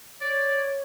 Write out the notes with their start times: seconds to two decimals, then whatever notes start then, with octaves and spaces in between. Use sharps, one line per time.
0.21 C#5 D5